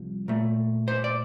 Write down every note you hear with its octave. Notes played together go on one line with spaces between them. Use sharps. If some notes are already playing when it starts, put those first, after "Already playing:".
Already playing: C2 F3
A#2 A3
C5
D5